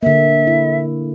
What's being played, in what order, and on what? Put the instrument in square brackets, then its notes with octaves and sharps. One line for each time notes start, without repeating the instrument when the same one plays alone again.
[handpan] D3 A#3 [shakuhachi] E5
[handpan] E4